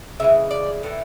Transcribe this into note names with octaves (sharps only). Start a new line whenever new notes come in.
C#3 E3 G#3 E5
D5
A2 E3 A3